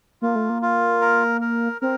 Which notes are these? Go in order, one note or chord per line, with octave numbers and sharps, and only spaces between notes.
A#3 F4
A3
A#3
F4
A#4
A#4
C4 A#4